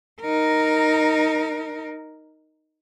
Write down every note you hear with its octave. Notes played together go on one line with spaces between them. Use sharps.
D#4 A#4